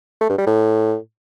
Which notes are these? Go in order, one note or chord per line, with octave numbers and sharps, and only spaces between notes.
A3
G2
G3
A2